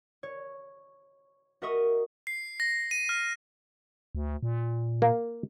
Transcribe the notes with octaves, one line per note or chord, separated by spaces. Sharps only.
C#5
F#4 A#4 D#5 E5 C#6 D#6
C7
A#6
D#7
F6
D2
A#2
A#3